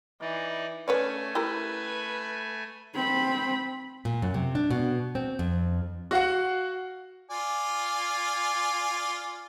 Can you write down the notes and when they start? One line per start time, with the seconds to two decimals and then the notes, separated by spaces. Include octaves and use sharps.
0.21 E3 D#4 D5
0.88 A3 C#4 B4 C#5 D5 G#5
1.35 E4 G4 A#4 B4
2.95 C4 B5
4.05 A#2
4.22 F#2
4.34 C3
4.55 D4
4.71 B2
5.15 C4
5.39 F2
6.11 F#4 F5 F#5
7.31 F4 D5 G#5